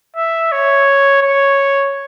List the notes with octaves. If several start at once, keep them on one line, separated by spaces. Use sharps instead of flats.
E5
C#5
C#5